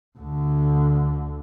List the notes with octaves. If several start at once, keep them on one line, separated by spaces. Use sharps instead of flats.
D2 D3